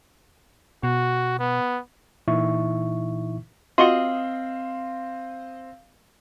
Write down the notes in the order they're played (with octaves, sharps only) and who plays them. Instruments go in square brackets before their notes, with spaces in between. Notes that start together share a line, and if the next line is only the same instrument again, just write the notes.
[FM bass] B2 [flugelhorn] F#4
[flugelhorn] B3
[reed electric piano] A#2 E3 D#4 E4 E5 C#6
[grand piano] C4 C6 G7 [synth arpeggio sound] F4 F#4 F#5 [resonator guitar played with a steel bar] D#5 [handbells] F5